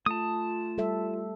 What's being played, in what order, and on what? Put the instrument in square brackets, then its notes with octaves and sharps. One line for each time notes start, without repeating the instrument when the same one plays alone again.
[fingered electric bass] A3 [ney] F4 [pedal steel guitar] A5 D#6
[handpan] G3 A4 E5